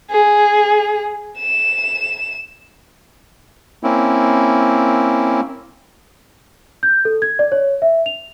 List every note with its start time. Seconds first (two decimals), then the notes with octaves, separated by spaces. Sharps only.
0.11 G#4
1.38 E7
3.83 A#3 C4 C#4 E4
6.83 G6
7.05 A4
7.22 G#6
7.39 D5
7.52 C#5
7.82 E5
8.06 F7